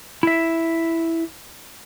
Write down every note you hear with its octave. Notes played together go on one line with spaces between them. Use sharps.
E4 E5